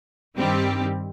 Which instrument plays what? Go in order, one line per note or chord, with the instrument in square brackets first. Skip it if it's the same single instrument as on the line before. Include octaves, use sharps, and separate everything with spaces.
[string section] G2 D#3 G3 C4 G4